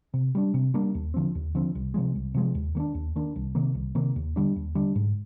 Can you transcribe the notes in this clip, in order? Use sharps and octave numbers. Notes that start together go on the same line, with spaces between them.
C3
G3 A#3 D4
C3
G3 A#3 D4
D#2
D3 F3 C4
D#2
D3 F3 C4
C2
C3 F3 G#3
C2
C3 F3 G#3
D#2
D#3 A#3 D4
D#2
D#3 A#3 D4
C2
C3 D#3 A#3
C2
C3 D#3 A#3
D#2
D3 G3 D4
D#2
D3 G3 D4
G#2